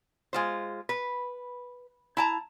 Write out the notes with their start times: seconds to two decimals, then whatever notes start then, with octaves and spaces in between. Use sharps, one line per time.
0.33 G#3 F4 C5
0.89 B4
2.17 E4 A5 A#5